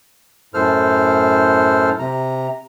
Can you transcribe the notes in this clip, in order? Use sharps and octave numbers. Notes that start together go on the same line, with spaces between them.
F#2 A2 A4 C5 F6
C3 A#5